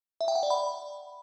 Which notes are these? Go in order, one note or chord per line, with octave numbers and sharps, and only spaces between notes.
E5
G5
F#5
D5
B5